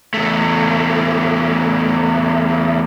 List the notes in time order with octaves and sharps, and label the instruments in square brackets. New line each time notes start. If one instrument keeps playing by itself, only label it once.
[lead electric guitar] E2 A3